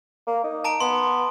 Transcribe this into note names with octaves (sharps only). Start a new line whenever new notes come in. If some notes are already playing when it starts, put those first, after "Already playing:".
A#3
D#4
A5 A#5 D7
B3 C6